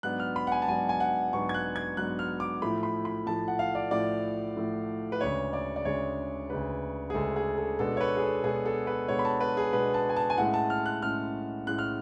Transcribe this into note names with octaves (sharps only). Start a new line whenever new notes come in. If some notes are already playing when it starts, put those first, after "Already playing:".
G#2 F#3 B3 D4 F#6
F6
B5
F#5
G#5
A5
G#2 F#3 B3 D4 G#5
G#5
F#5
G#2 F#3 B3 D4 C#6
G#6
F#6
G#6
G#2 F#3 B3 D4 F#6
F6
D6
A2 F3 A3 B5
B5
B5
A2 F3 A3 A5
F#5
F5
D5
A2 F3 A3 D5
A2 F3 A3
B4
D2 C#3 G#3 D4 C#5
D5
D5
D2 C#3 G#3 D4 C#5
D2 C#3 G#3 D4 B4
G#4
D2 C#3 G#3 D4 A4
G#4
A4
B2 G#3 B3 D4 A4
C#5
B4
G#4
A4
B2 G#3 B3 D4 G#4
A4
B4
B2 G#3 B3 D4 C#5
B5
A5
B4
G#4
B2 G#3 B3 D4 B4
A5
G#5
A5
G#5
A2 G#3 C#4 F#5
A5
F6
F#6
A2 G#3 C#4 F6
A2 G#3 C#4 F#6
F6